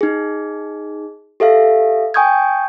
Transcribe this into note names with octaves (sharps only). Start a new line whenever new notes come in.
D#4 G#4
G4 A4 E5 F5
G5 G#5 C#6 D#6 G6 G#6